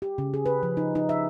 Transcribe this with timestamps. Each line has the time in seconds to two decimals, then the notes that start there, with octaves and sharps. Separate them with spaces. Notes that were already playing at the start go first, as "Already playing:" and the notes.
0.02 G4
0.18 C#3
0.34 G#4
0.46 B4
0.63 F3
0.77 D#4
0.95 D#4
1.09 E5